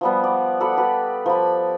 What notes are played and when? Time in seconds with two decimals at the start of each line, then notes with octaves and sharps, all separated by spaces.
0.01 F3 G3 B3
0.24 D5
0.60 A4 D5 F#5 B5
0.78 G4 B4
1.26 F3 B5